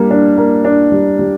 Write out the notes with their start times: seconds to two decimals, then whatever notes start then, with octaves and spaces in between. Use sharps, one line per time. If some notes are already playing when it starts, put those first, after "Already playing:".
Already playing: G3 A#3 D4
0.11 D4
0.38 A#3
0.65 D4
0.92 G3
1.19 G3